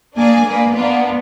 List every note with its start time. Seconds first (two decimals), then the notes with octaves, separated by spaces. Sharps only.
0.16 A#3 D4 G#4 D5 G#5
0.45 A#3 G#4 B4 D5
0.74 A#3 B3 D4 F4